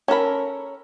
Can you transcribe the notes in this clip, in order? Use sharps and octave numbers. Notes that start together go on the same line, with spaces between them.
C#4 A4 A#4 B5